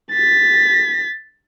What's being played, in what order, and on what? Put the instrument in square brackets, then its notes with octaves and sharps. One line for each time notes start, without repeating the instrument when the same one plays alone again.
[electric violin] A6 B6